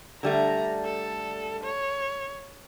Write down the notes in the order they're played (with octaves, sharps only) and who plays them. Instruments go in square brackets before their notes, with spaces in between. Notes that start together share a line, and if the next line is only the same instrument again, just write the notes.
[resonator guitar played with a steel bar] D3 G3 A3 [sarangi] A#5
[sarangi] A4
C#5